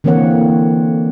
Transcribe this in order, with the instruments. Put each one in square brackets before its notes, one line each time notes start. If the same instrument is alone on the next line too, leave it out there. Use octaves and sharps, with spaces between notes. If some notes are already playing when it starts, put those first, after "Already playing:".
[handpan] D3 E3 A#3 C4 C#5 F#5